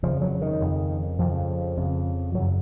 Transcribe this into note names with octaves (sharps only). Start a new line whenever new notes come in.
F2 C#3 F3
F#3
D#3
F2 C#3
F2 C#3 F3
F2 C#3
F#2 C#3 F#3